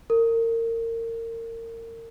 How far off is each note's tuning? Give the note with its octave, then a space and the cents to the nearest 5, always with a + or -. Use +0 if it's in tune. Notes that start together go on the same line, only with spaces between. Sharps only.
A#4 -30